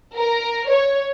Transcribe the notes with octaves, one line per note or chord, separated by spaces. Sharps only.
A#4
C#5